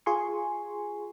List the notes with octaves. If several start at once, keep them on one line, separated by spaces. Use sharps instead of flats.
F4 G#4 G#5 C6 C#6